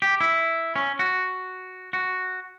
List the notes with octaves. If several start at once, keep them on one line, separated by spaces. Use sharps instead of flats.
G4
E4
C#4
F#4
F#4